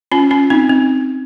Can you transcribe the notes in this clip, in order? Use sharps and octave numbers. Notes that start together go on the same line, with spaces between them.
C#4 F4
C#4 F4
C4 D#4
C4